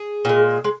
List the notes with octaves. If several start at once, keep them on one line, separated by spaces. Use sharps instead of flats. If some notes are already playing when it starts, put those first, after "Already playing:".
Already playing: G#4
A#2 G#3
G#3